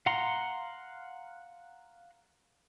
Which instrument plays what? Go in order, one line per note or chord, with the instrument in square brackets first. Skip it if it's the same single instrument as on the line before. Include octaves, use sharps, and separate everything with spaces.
[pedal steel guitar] F5 F#5 A#5 C6